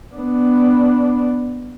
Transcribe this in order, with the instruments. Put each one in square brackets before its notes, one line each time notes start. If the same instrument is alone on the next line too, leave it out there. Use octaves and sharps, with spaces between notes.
[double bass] B3 D4